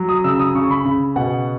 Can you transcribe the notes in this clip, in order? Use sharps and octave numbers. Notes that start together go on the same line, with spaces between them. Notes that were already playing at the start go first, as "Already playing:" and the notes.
Already playing: F#3
D#6
C#3 E6
D#6
C#3 C#6
B5
C#3
B2 F#5